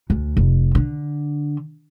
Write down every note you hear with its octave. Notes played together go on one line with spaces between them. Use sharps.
D2
F1
D3